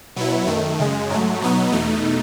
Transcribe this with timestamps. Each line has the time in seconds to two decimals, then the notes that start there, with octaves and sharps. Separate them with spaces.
0.16 B2 F#3 B3 E4
0.47 F#2 D#3 A3
0.79 F#2 C#3 G#3
1.09 G#2 F#3 A3
1.41 B2 F#3 B3 D#4
1.72 E2 B2 A3 D#4